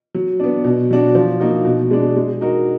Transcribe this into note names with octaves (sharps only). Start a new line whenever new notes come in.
F#3
B3 D4
B2
F#3 D4 F#4
F3
A#3 D#4 F#4
B2
G#3 D4
G#3
D#4 F#4 A#4